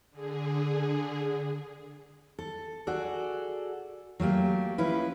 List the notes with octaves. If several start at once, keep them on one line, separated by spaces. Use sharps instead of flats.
D3 G#4
A4
F#4 G#4 A4 D5
F#3 A3 A#3 G4
F3 C#4 E4 B4